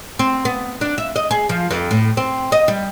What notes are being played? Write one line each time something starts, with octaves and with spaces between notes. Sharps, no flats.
C4
B3
D4
E5
D#5
G#4
F3
F2
A2
C4
D#5
G3